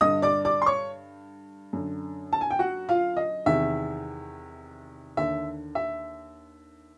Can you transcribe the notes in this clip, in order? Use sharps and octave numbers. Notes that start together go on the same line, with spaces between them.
G2 D3 D#5 D#6
D5 D6
D5 D6
C6
C#5 C#6
F#2 D3
A5
G#5
G5
F#4 F#5
F4 F5
D#5
E2 C3 D#3 E5
D#2 D3 E5
E5